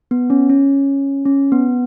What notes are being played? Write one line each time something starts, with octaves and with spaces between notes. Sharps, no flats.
B3
C#4
C#4
C#4
B3